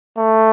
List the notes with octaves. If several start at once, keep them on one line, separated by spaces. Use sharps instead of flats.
A3